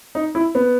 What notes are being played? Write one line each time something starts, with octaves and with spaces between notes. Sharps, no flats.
D#4
E4
B3